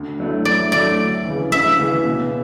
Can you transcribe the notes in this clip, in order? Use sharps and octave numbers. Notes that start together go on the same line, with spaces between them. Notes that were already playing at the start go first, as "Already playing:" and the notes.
Already playing: D2
D3 F#3 A3 E4
D2 D5
D3 F#3 A3 E4 D5
D2
C#3 E3
D2 E5
C#3 E3
B2